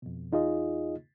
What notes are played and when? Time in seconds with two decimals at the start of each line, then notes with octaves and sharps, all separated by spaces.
0.02 F2 B2
0.32 E2 D#4 F4 G#4 D#5